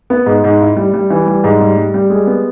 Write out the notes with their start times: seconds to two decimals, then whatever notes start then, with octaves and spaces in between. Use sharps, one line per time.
0.10 B3
0.26 G#2
0.44 G#2
0.61 E4
0.77 G3
0.94 G3
1.10 E3
1.26 G3
1.44 G#2
1.60 G3
1.77 G3
1.94 G3
2.10 G#3
2.27 B3